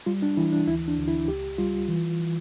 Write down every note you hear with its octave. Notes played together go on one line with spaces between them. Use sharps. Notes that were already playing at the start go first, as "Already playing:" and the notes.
G3 F4
D4
E3 E4
D4
D2 E4
D4
D2
E4
C#2 G4
G3 F4
E3
E3